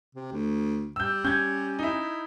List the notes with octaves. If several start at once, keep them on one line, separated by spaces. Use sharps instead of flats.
C3
D2
G3 E6 G6
C#4 G6 G#6
D#4 E4